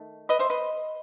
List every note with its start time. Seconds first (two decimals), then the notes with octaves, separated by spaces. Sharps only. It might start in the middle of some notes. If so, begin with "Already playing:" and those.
Already playing: D#3 A3
0.29 B4 D#5
0.39 C5 E5
0.50 B4 D#5